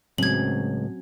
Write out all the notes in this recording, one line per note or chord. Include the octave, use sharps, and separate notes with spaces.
C#2 A2 F#3 C4 C#4 G#6 F#7